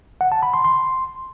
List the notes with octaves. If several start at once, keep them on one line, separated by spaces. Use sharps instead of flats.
F#5
A5
B5
C6
C6